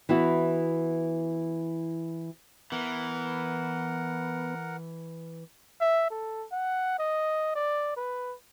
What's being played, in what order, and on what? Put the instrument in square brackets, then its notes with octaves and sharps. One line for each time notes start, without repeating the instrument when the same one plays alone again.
[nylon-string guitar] E3 B3 E4 F#4
[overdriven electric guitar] E3 [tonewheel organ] B3 [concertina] A#4 F#5
[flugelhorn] E5
A4
F#5
D#5
D5
B4